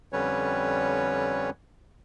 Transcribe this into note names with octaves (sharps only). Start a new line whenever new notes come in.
F2 D3 G3 C#4 B4 C#5